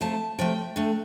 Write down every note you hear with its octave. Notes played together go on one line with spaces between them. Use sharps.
C3 F3 A3 A5
C3 F3 A3 G5
D3 A3